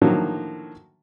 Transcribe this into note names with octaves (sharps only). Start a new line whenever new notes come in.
A2 D3 D#3 F3 F#3 A#3